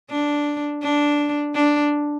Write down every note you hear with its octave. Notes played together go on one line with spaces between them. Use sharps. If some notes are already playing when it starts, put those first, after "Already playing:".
D4
D4
D4